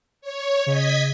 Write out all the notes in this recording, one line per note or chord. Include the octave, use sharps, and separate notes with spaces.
C#5
C#3 D#5 G#6 B6